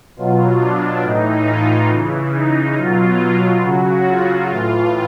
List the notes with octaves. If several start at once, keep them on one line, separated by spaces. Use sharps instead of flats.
B2 F#3 F4
D4
A2 E3 D#4
F4
C#3 E3
D#4
B2 F#3 F4
C#3 F#3 F#4
F4
A2 E3 F4